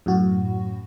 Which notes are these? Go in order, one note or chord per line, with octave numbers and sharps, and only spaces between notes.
F#2 A2 F#4